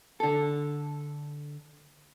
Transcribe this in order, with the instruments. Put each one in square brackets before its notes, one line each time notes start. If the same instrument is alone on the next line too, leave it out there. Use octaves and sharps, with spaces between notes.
[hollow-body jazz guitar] D3 A4